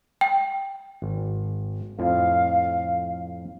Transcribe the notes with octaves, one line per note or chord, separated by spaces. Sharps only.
G5
G#1
F2 A2 F3 F5